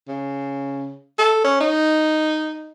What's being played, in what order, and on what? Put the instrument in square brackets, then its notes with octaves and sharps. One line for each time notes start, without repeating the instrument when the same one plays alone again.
[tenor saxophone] C#3
A4
C#4
D#4